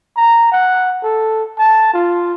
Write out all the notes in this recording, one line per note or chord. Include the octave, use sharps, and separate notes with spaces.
A#5
F#5
A4
A5
F4